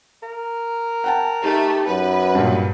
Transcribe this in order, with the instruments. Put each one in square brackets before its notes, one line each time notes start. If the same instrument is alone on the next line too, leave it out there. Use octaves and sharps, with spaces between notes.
[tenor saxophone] A#4
[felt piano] F#5 G5 A5
[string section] A3 [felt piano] D#4 [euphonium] G4
[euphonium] F#2 [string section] B4
[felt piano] G2 A#2